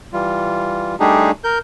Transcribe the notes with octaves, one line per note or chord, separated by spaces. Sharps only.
E3 G3 F4
G3 A3 D4 D#4 G4 G#4
A#4 G6